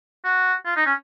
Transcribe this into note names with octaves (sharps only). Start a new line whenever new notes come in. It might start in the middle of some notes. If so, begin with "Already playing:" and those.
F#4
F4
D#4
C#4